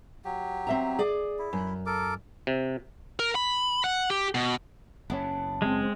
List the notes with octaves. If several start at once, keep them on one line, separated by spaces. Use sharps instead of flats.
F#3 G4
C4 E5 A#5
G#4 D5
E4
F#2
A4 A#4 D6
C3
A#4
B5
F#5
G4
B2
F#1 A2 B3 C#4 D4 E4
G#3 C4